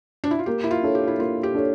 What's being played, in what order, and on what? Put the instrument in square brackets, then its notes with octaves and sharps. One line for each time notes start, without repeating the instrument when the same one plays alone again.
[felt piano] D4
E4
F4
[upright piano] A#3 [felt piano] G4
[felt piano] E4
F4
[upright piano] D4 A4 C#5
[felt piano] G4
E4
[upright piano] A#3 [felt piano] F4
[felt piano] G4
[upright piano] D4 A4 C#5